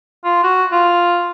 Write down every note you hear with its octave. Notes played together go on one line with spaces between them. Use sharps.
F4
F#4
F4